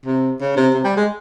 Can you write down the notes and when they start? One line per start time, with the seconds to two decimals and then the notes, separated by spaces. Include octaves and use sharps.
0.06 C3
0.41 C#3
0.57 C3
0.74 C3
0.84 G3
0.97 G#3